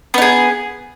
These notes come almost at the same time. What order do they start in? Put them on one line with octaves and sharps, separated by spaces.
B3 D#4 G#4